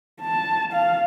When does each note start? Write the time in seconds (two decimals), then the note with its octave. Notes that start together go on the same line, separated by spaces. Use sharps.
0.21 A5
0.72 F5